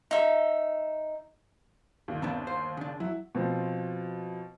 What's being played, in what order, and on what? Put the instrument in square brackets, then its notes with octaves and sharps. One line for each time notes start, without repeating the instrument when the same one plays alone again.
[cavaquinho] D#4 E5
[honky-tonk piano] G1 D#2
[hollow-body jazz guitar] C3 B3 D4
C5
C#3 D4
[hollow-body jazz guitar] F#3 [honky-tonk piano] E4
[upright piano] B2 F3 C4